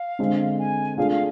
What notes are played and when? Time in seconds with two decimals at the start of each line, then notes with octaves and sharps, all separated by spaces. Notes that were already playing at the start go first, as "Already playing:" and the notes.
Already playing: F5
0.19 D3 G#3 C4
0.59 G#5
0.97 A3 D4 F4 G#4 F5
1.11 F5